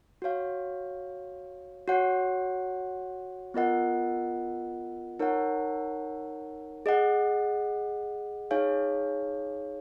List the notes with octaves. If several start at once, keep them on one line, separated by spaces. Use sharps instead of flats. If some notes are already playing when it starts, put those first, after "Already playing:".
F#4 C#5 F5
F#4 C#5 F#5
B3 F4 A#4 D#5 F#5
D#4 A#4 C#5 F#5
G#4 D#5 F#5
D#4 G#4 C#5 F5 G#5